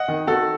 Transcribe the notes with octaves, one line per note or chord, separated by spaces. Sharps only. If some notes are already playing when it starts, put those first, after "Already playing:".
Already playing: D#5 F#5
D#3
D#3 F#4 A4